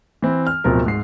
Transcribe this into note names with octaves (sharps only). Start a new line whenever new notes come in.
E3 C4 E4
F6
D1 B2 F3 C4 A#4
G#2 C7